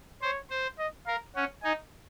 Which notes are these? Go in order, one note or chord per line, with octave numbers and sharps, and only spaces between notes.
C5 C#5
C5
D#5
A#4 F5
C#4 F#5
D#4 G#5